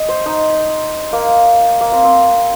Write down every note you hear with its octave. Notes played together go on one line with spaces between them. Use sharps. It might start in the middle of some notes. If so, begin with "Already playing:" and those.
Already playing: D#5
C5
D#4
A#3
A#3
C4
C4